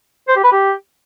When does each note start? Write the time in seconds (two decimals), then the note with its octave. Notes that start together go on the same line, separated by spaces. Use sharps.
0.28 C5
0.36 G4
0.44 B4
0.52 G4